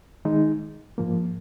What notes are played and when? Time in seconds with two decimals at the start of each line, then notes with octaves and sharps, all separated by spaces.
0.25 D#3 G#3 D#4
0.98 G#2 F3 A#3